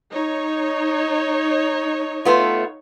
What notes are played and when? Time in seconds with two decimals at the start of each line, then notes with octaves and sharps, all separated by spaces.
0.12 D#4 C#5
2.25 A3 B3 F4